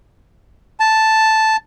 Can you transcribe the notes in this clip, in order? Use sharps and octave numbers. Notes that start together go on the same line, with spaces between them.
A5